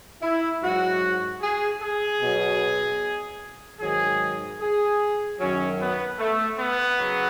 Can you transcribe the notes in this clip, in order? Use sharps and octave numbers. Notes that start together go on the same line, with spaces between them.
E4
G#2 F#3 F#4
G#4
G#4
B2 F#3
G#2 D#3 F#3 G#4
G#4
F#2 D#3 F#3 C#4
B3
A3
B3
C#3 F#3